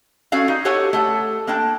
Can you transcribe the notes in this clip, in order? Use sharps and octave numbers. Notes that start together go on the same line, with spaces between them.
C#4 F#4 A4 D5 F5
D#4
F#4 G4 A4 C#5 F#5 G#5
A3 A4 F#5
A#3 D4 G5 A5